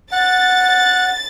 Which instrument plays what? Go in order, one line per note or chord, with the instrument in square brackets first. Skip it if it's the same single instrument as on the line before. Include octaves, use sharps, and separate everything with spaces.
[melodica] F#5 [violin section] A6